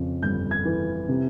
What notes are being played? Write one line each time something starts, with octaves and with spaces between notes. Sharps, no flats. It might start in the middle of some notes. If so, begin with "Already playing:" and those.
Already playing: F2 C#3
G1 G6
G#6
E3
C3